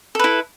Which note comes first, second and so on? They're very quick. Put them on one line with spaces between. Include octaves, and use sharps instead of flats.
A4 B4 E4